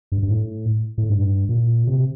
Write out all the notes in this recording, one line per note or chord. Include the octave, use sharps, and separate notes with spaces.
G2
G2
A2
A2
G2
A#2
C3